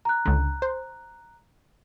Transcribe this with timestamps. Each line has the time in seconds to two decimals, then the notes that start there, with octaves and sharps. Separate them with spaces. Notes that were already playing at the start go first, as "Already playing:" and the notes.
0.05 A#5 F#6
0.26 C#2 D3
0.62 C5